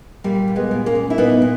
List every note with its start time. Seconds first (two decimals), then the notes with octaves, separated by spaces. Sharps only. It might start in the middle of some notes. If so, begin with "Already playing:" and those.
0.24 A#2 G3 A#3
0.48 A#2
0.55 G#3 B3
0.71 A#2
0.86 A#3 C#4
0.95 A#2
1.10 E4
1.18 A#2 B3 D#4
1.42 A#2